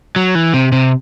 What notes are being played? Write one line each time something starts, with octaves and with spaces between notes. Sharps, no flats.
F#3
E3
C3
C3